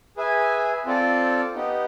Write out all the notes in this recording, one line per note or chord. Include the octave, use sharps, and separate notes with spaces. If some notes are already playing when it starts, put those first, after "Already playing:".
G#4 B4 E5 G#5
C4 F4 A4 D5
B3 D#4 G4